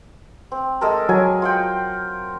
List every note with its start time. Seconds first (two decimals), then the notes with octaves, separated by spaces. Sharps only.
0.52 C4
0.81 G#3 A4 A#4
1.09 F#3 G#5
1.42 F4 F#5 G5